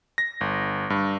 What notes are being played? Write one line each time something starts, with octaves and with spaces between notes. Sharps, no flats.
A#6
G1
G2